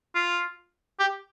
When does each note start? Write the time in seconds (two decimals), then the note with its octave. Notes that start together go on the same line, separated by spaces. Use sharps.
0.15 F4
1.00 G4